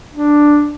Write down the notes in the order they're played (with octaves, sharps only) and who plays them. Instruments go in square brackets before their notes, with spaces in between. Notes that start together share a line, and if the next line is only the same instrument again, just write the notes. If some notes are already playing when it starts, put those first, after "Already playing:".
[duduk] D4